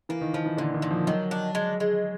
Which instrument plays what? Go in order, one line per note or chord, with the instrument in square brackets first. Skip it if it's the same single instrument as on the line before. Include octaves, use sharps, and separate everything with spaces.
[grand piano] E3 [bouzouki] A#3
[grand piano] D#3
[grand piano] D#3 [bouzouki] F3
[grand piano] E3
[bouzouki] A#2 [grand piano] D3
[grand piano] D#3
[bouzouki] A#2
[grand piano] F3
[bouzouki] D#3 [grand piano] F#3
[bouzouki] D4
G#3
G#3